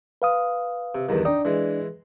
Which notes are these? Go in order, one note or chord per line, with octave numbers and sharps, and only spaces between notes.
B4 F5 D#6
C3
E2 G2 D#3
D4 D#4 D5 D#5 G5
E3 G#3